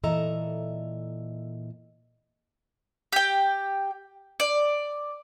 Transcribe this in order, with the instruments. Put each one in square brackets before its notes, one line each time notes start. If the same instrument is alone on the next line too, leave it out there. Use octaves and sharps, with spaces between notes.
[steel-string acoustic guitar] A#2 E3 A4 D#5 E5 A#5
[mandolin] G4 G5
D5